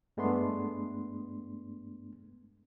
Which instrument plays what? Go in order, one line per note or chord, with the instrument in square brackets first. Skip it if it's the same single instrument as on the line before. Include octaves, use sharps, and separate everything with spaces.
[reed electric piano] G2 G#3 A3 B3 D4 C6